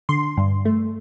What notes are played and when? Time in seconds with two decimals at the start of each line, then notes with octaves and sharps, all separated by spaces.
0.09 D3 C6
0.37 G2
0.65 A3